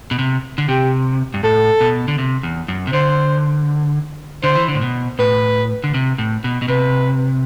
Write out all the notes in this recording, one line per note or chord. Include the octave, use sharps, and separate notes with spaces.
B2
C3
D3
C3 G4
G2
A2 A4
B2
D3
C3
E2
F#2
C3
D3 C5
D3 C5
E3
D3
A2
B2
A2 B4
D3
C3
A2
B2
B2
C3 B4